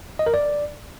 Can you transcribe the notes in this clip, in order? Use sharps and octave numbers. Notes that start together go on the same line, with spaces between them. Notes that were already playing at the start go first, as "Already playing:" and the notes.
D#5
A#4
D5